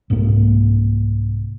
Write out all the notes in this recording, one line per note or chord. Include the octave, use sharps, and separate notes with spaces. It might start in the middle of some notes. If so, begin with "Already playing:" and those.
C2 G#2 C3 A#3